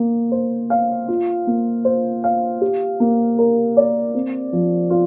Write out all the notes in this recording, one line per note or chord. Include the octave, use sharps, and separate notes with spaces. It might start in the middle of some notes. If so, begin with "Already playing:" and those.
Already playing: A#3
C5
F5
F4
A#3
C5
F5
G4
A#3
A#4
D5
C4
F3
F4